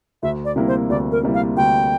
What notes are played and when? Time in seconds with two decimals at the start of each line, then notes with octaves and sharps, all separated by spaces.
0.23 D2 E5
0.45 D5
0.56 C3 G3 A#3 E4
0.68 C5
0.89 D2 D5
1.12 A#4
1.23 C3 G3 A#3 E4
1.34 F5
1.57 D2 G5